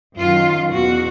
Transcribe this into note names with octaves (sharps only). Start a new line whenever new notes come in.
F#2 D#3 F4
E2 B2 F#4